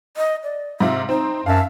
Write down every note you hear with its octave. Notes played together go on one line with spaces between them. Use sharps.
D#5
D5
G#2 C3 F4 E5
C4 D#4 C5
F#2 E5 F5 A5